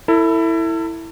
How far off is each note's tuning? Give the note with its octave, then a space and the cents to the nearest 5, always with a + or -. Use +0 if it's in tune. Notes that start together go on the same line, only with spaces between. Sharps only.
E4 +0 A4 +35